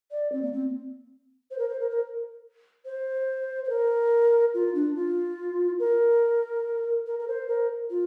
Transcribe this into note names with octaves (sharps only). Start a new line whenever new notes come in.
D5
C4
A#3
C4
C5
A#4
C5
A#4
A#4
C5
C5
A#4
F4
D4
F4
A#4
A#4
A#4
C5
A#4
F4